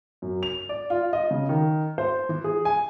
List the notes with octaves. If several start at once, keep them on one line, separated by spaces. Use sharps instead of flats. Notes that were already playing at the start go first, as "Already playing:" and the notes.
F#2
F7
D5
F4
D#5
C#3
D#3
C5
E3
G#4
G#5